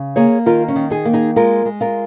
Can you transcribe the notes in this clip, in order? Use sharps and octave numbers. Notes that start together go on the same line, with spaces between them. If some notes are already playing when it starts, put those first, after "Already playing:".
Already playing: C#3
A#3 G#4 C#5
D#3 F4 A#4
C#4
D#3
D#4 G#4
A#3
D#4 G#4
G#3 F4 A#4
G#3
F4 A#4